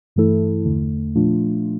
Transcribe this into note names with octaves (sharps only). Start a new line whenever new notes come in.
G2 E3 A3 E4 A4
E2 D3 A3
A#2 F3 A3 D4 F4